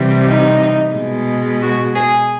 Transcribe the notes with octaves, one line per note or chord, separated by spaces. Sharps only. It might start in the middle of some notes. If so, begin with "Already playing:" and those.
Already playing: C3 E3 G3
D#4
B2 G#3
F#4
G#4